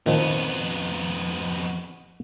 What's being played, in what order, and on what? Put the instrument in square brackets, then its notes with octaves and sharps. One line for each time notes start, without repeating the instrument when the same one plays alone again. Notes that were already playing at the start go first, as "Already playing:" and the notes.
[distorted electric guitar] F2 B3 [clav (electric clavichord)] A#2 D#3 F3